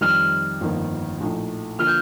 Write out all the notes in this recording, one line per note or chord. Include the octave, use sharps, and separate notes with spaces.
F2 D#3 G3 F6
G1 F2 D#3 A#3
A#1 A2 A3 D#4
D3 F3 A#3 F4 F6
G6